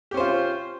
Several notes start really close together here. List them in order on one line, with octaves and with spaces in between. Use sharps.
G4 C#4 C5 F4